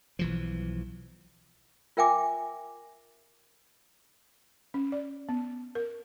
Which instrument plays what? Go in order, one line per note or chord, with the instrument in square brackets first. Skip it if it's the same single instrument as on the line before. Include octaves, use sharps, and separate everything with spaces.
[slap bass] B1 E3 F3
[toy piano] F4 A#4 E5 G5 G#5 D6
[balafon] C#4
D5
B3
A#4